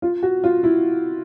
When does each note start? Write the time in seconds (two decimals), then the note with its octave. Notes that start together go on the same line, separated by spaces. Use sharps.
0.02 F4
0.23 F#4
0.44 F4
0.64 E4